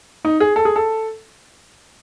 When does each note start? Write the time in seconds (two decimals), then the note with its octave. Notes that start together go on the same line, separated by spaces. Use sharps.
0.25 D#4
0.40 G#4
0.56 A4
0.65 G#4
0.76 A4